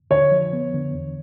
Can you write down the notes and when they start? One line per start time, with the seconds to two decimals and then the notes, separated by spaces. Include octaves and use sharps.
0.11 D3 C#5
0.31 F3
0.53 B3
0.74 D3
0.94 E2